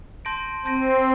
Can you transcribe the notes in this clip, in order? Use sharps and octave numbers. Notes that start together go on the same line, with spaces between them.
A5 C6 G6 A#6 D7
C4 A5 C6 G6 A#6 D7